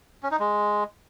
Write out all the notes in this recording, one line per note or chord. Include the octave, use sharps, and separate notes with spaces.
C#4
D#4
G#3